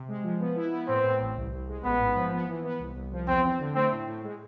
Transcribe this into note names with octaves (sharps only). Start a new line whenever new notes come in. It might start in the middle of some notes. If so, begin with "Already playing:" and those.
Already playing: C3
G#3
F3
B3
E4
B3
A2 C4
A2
A1
C2
C2
G#3
A1 B3
G#2
F3
B3
E3
B3
C2
C2
F3
E2 C4
C4
D3
A3 C4
A2
A2
G#3